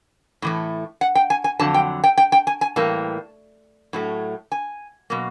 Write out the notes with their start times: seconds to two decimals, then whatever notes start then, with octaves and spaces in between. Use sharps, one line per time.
0.42 A2 E3 A3
1.01 F#5
1.15 G5
1.30 G#5
1.44 G#5
1.59 F2 D3 F#3 A5
1.74 G5
2.04 G5
2.18 G5
2.32 G5
2.47 G#5
2.61 G#5
2.76 A2 E3 G3 A#3 A5
3.93 A2 F#3 A3
4.52 G#5
5.10 B2 F#3 A#3